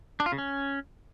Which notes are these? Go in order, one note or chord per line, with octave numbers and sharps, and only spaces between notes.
D4
F4
C#3
C#4